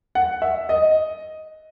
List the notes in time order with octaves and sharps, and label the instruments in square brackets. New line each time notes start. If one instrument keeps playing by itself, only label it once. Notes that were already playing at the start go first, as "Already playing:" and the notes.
[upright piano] F#5
E5
D#5